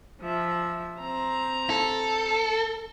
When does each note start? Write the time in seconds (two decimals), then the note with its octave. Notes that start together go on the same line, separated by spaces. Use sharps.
0.21 F3 E5
1.00 C4 A#5
1.70 A4